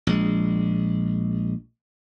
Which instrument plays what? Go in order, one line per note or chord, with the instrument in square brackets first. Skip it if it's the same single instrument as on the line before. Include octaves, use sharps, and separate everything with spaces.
[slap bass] A#1 G#3